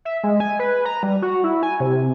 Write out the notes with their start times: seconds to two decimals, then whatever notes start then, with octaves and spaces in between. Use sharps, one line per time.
0.05 E5
0.24 G#3
0.40 G#5
0.59 B4
0.85 A#5
1.03 G3
1.22 F#4
1.44 E4
1.63 G#5
1.80 C3